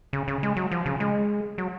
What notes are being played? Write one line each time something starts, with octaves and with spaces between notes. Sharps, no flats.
C#3
C#3
G#3
F#3
F3
C#3
G#3
F#3